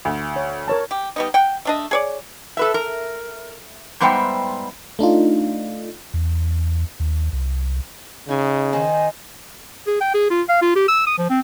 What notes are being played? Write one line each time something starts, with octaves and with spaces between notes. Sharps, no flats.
D2
C#5
A#4 C#5 A5
G4
G3 B3 D#4
F#5 G5
A3 D4 D#5
G#4 C#5 D5
A4 B4 E5
A#4
G#2 G3 B3 C5 E5 G5
A3 D4 D#4 F4
E2
D#2
C2
C#3 D#4 G#5
D#3 D#4 C5 G#5
G#4
G5
G#4
F4
F5
F4
G4
E6
D#6
F3
C4